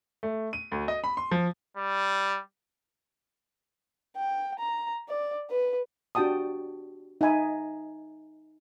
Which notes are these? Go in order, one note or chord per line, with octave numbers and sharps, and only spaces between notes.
A3
D#7
D2
D#5
B5
C6
F3
G3
G5
A#5
D5
B4
D4 F#4 G4 G5 A5 D#6
D#4 E5 G#5 B5